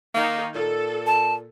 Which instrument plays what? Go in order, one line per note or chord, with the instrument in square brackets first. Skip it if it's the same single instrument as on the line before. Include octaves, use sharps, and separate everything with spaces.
[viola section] D#3 D#4 [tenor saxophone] A#3
[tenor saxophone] A#2 [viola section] A4
[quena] A5